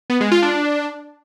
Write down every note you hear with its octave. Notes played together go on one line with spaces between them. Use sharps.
B3
G#3
F4
D4